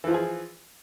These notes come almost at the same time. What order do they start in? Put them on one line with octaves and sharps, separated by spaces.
E3 F3 F4 G#4